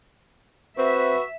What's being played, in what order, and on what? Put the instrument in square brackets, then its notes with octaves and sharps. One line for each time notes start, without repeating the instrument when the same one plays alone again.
[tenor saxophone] C4 [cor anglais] F#4 [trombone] B4 [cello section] E5